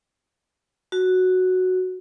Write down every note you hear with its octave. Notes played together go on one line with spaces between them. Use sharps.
F#4